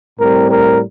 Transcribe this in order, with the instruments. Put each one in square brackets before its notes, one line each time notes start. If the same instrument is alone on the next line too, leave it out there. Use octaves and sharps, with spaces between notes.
[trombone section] A2 G3 C4 A#4
A#4